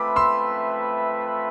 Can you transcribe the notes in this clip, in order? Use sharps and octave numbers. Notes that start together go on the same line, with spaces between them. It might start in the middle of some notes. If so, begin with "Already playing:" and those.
Already playing: A3 C4 F4 B4 E5 B5 D6
C6 E6